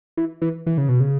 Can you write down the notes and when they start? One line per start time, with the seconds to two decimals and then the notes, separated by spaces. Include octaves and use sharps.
0.17 E3
0.42 E3
0.67 E3
0.78 C#3
0.89 B2
1.00 C#3